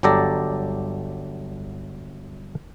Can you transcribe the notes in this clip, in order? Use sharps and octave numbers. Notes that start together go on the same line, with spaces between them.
G1 F#3 G4 A4 D5 A#5